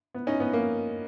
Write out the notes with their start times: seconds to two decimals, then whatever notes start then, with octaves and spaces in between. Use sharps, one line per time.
0.14 B3
0.27 C#4 D#4
0.40 B3
0.53 A#3